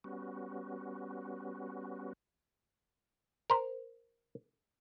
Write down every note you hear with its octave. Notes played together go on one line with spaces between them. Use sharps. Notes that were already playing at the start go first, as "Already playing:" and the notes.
G3 B3 C#4 F#4
A#4 C5